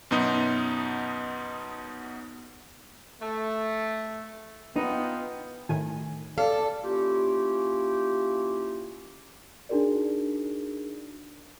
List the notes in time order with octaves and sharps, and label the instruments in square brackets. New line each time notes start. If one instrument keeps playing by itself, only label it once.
[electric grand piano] F#2 B2 B3 D#4
[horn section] A3
[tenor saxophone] B3 [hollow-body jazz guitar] D#4 [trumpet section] F4 G5
[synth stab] A2 D#3 G#5
[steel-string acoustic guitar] A4 [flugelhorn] D5 [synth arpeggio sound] F5
[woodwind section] A#3 C#4 E4 F4 G4
[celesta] D4 D#4 F#4 G#4 A#4 D5